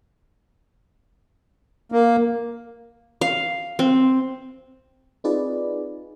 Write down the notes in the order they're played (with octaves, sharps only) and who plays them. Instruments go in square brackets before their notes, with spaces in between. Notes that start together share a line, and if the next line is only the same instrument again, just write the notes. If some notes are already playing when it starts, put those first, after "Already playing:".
[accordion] A#3
[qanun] F5
C4
[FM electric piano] C4 D#4 F4 G#4 B4 D5